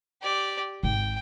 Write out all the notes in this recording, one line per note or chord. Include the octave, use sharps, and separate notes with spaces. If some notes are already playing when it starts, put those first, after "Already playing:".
G4 D5
G#1 G5